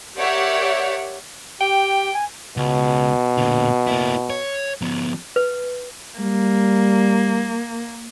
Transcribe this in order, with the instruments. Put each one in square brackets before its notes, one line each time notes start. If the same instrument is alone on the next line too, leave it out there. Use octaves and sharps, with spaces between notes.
[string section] G4 A#4 C#5 D5 E5 F#5
[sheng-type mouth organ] G4 [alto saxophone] G5
[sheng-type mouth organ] G#5
[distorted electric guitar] C#2 [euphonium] B2
[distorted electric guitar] A#2 D3
A#3 E4
C#5
F3 B3
[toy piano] B4
[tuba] G3 [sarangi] A#3